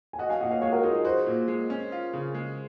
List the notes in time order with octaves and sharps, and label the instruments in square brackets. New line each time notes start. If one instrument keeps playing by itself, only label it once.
[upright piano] G#5
[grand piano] F#4 [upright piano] D#5 F#5
[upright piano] F5 G#5
[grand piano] A#2 [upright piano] D#5 F#5
[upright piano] C#5 F5
[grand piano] G#3 [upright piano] C#5 F5
[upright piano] F#4 A#4
[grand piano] D#4 [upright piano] F4 G#4
[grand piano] F#4 [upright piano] G#4 C5
[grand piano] A#2
G#3
C#4
F4
C#3
G#3